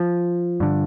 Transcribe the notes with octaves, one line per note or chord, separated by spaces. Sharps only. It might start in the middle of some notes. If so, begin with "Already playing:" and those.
Already playing: F3
G2 D3